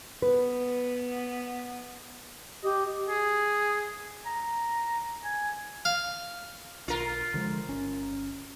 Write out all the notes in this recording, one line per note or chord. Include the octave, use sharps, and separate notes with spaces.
B3 B4
G4 D#5
G#4
A#5
G#5
F5
B1 F4 A#4
D3 F3 G#3
G1 C#4